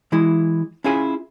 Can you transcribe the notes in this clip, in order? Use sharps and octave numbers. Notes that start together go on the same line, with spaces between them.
E3 G#3 E4
C#4 E4 F4 G#4 G#5